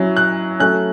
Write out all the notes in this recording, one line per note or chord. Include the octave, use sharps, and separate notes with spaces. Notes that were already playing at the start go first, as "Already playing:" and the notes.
Already playing: F#3 C#4 E4
F#6
F#3 A3 C#4 F#6